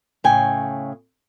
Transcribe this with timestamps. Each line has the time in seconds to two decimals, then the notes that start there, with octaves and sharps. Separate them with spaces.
0.24 A2 C#3 G5 G#5